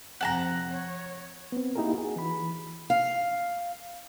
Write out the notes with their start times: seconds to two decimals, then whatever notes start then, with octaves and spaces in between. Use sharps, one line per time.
0.21 F2 C3 F#5 A5 A#5
0.70 C#5
1.52 B3 C4
1.76 A#3 D#4 E4 G4 G#4 A#4
1.94 F#4 G#4
2.16 E3 B5
2.90 F5